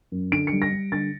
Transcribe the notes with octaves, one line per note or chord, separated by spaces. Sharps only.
F#2
D3 D7
C#7
G3
A#6
G3
D3 A6